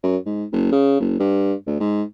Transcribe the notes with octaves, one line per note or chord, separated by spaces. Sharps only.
F#2
G#2
F#1
C#3
F#1
G2
D2
G#2